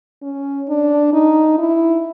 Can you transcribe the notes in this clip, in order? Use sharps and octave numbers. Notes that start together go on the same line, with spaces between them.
C#4
D4
D#4
E4